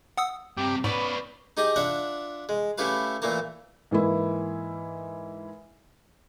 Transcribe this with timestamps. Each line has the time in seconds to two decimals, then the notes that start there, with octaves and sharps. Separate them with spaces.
0.17 F#5 D#6 E6
0.57 G2 C3 G4 D6
0.84 G#2 B3 C#4 B4 D5
1.57 D#4 G4 G#4 D#5 D6
1.76 D4 F4 D5 E5 F#5
2.49 G#3
2.78 A3 C#4 E4 G4 B4 F5
3.22 A#2 E3 A3 A#3 A5
3.91 G#2 E3 A#3 E4